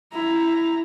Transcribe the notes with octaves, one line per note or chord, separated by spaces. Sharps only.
E4 A#5